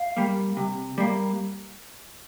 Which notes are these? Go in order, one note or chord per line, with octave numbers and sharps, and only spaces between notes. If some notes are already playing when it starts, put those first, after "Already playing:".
Already playing: F5
G3 A#3
C3
G3 A#3